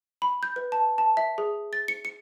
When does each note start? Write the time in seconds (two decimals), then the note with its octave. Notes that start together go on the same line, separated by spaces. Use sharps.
0.22 B5
0.43 G6
0.56 B4
0.72 A5
0.98 A5
1.17 E5
1.38 G#4
1.73 A6
1.88 C#7
2.05 C#7